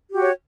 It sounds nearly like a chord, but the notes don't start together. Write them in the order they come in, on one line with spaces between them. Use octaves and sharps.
G4 F#4 G5 C#5